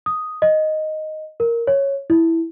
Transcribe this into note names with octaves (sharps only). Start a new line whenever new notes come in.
D#6
D#5
A#4
C#5
E4